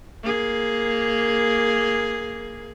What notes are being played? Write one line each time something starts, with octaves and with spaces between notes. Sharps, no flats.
A#3 G#4